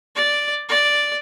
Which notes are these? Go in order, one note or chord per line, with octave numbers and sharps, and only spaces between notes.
D5
D5